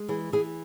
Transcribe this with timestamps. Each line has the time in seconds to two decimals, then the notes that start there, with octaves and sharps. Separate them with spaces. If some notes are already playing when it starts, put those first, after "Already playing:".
Already playing: G#3
0.09 E3 G#4
0.32 E3 G#4